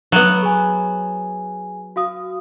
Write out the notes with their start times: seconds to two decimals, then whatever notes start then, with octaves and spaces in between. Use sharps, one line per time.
0.12 F#3 B3
0.42 G#4 G#5
1.96 F#4 F5 D#6